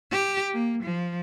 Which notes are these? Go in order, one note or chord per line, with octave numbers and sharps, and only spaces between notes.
G4
A#3
F3